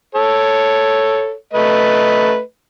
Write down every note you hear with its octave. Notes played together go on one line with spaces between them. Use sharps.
A4 C#5
A3 B4 D#5